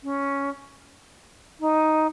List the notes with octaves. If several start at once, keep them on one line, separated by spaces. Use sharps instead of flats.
C#4
D#4